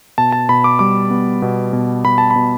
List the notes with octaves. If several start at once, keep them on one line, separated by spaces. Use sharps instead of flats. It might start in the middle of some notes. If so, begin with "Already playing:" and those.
B2 A5
A5
B2 B5
D6
G3 D6
B3
B2
B2
B2 B5
A5
B5
B2